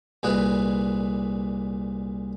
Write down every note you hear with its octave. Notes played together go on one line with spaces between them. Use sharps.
C2 A#2 G#3 B4